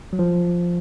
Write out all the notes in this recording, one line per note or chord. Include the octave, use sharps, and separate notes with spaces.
F#3
F3